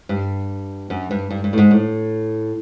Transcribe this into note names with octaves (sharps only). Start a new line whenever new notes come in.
G2
F#2
G2
G2
G2
A2
G#2
A2